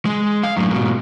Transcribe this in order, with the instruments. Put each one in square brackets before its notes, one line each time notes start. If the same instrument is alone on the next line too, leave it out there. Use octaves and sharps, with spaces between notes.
[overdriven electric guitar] G#3
F5
F#2 A2
G#2 B2